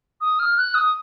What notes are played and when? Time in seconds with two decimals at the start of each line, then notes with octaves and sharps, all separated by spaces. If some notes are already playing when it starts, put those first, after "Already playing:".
0.21 D#6
0.39 F6
0.57 F#6
0.75 D#6